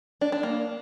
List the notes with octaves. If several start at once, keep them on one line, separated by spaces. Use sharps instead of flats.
D4
D4
A#3